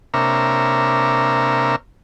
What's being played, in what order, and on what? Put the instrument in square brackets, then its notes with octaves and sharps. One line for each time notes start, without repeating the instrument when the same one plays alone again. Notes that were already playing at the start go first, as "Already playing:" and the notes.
[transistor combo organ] C3 A#3 D4 A#4 C#5 E5